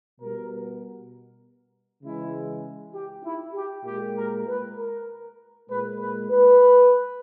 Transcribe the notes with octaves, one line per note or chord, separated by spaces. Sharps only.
B2 G3 A#4
C#3 E3 G#3 E4
G4
E4
G4
A#2 G#3 G4
A#4
B4
A#4
A#2 G#3 B4
B4
B4